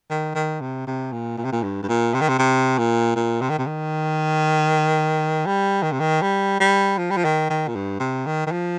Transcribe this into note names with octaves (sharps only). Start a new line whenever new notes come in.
D#3
D#3
C3
C3
A#2
A#2
C3
A#2
G2
G2
A#2
C3
D#3
C3
C3
A#2
A#2
C3
D#3
C3
D#3
G3
D#3
C3
D#3
G3
G3
F3
G3
F3
D#3
D#3
A#2
G2
C3
D#3
D#3
F3